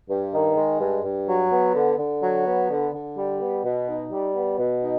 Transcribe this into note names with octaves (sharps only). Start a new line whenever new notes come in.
G2
D#3
G#3
G2
G2
F#3
B3
D3
D3
F#3
B3
D3
D3
G3
B3
B2
D#4
G3
B3
B2
D#4